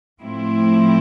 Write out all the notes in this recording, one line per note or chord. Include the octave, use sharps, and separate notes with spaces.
A2 F3 C4 E4